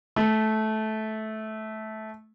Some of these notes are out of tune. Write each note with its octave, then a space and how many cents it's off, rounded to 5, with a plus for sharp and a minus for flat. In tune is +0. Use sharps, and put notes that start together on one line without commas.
A3 -15